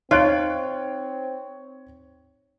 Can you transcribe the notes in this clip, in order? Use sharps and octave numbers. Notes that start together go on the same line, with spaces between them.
C4 D#4 F4 C#5 D#5 F#6 D7